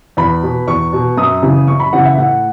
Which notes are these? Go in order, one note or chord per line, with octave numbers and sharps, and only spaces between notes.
E2 B5
B2
E2 C#6
B2
F#2 D#6
C#3 E3
F#2 C#6
B5
C#3 E3 F#5
E5
A2 F#5